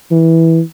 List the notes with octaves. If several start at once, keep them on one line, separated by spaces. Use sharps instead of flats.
E3